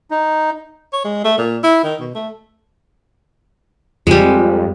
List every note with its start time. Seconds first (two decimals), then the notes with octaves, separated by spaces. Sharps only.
0.11 D#4
0.93 C#5
1.04 G#3
1.24 A3
1.38 A#2
1.63 E4
1.83 D#3
2.01 B2
2.15 A3
4.07 F2 G3 G#3